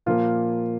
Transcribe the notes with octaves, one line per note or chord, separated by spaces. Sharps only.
A#2 F3 A#3 F4